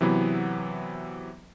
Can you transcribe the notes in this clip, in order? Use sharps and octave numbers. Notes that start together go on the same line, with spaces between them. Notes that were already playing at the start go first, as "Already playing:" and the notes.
C3 E3 F#3 B3 E4